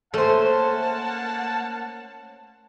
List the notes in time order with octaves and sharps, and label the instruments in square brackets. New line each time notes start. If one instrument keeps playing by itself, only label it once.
[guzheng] A3 [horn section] A#3 F#5 A5 [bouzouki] C#4 C5